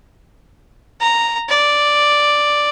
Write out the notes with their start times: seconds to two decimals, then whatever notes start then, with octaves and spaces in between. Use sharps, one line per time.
1.01 A#5
1.49 D5